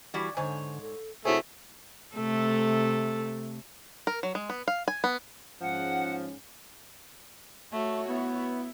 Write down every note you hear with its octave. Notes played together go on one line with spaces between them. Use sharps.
E3 G3 F#4
G#2 D3 C5 C#5 G#5
A4
C3 A3 E4 F#4 G#4 C5 C#5
C3 A3 A4
A#4
F#3
G#3
B3
F5
G#5
B3
G#2 F3 C#4 F#5
A3 F#4 C#5
B3 E4